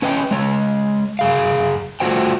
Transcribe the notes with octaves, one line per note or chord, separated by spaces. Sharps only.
C#4 B4 D#5 G5
G#3 C#5
F#2 G#4 F5
A3 F4 F#4 C5 G5